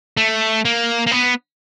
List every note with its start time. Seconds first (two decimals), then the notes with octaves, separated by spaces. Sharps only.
0.17 A3
0.65 A#3
1.07 A#3
1.11 B3